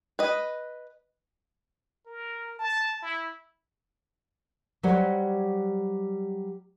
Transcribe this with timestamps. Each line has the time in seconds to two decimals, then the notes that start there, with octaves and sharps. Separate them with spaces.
0.19 B4 D#5
2.06 A#4
2.59 A5
3.02 E4
4.83 F#3 G3 G4 C5 C#5 F#5